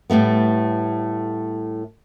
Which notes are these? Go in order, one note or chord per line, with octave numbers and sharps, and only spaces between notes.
A2 G3 A3 B3